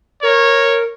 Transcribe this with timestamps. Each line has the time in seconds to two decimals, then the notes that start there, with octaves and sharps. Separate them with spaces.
0.23 A#4 C#5